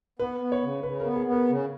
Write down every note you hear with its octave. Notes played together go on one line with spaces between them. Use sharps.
B3 B4
B3
C#5
C#3
C#3 B4
B3 A#4
G#4
B3
A#4
C#3